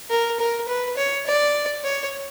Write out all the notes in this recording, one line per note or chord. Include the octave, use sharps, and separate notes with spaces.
A#4
A#4
B4
C#5
D5
C#5